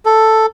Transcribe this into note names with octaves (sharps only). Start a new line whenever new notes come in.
A4